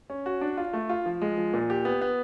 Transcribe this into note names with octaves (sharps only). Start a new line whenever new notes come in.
C#4
F#4
D4
F4
A3
F4
F3
G#3
F3
A#2
G4
B3
B3